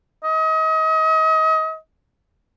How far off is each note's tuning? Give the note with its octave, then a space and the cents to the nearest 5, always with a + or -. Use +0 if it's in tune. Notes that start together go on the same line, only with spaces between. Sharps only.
D#5 +35